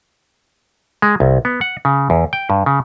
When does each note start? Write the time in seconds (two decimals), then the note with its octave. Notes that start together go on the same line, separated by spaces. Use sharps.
1.02 G#3
1.20 C2
1.45 B3
1.61 F#5
1.85 C#3
2.10 E2
2.33 G5
2.50 G2
2.66 C#3